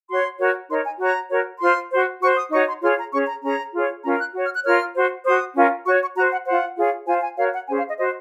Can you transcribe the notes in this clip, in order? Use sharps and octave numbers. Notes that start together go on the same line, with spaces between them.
F#4 C#5 C6
F#4 A#4 C#5
D#4 A#4 C#5 C6
G#5
F#4 C#5 A#5
F#4 A#4 C#5
F4 C5 C6
F#4 C5
F#4 C5 C#6
D#6
D#4 F#4 C#5 C#6
C6
F4 G#4 C#5 C6
A#5
C#4 G#4 C#5 C#6
A#5
C#4 G#4 C#5 A#5
F4 G#4 C#5
C#4 F4 A#4 A#5
F#6
F#4 C#5
F6
F#6
F4 A#4 C#5 F6
F#4 C5
F#4 C5 D#6
C#4 F4 A#4
F#4 C#5 C#6
C#6
F#4 C5 A#5
F#5
F4 C5 F#5
F4 G#4 C#5
F4 C5 G#5
G#5
F#4 A#4 C#5 F5
F#5
C#4 G#4 C5 G#5
F5
D#5
F#4 C5 D#5